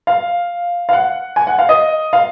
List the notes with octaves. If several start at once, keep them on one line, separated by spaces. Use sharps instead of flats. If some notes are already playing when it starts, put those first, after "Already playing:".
F5
F5
F#5
G#5
F#5
F5
D#5
F5